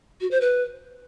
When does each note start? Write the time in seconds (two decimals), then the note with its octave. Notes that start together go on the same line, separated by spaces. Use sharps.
0.21 F#4
0.31 C5
0.41 B4